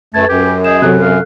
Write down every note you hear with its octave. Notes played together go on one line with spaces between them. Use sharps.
F#2 A3 A4 B4 A5 G#6
F#2 G4
G#4 D#5 G6 E7
C3 F#3 A4 F#6
F5